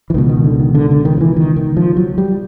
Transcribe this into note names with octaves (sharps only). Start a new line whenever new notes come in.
E3
C#2 B2 D#3
D#3
D3
D#3
D3
D3
D#3
F3
E3
D#3
D#3
F3
F#3
G3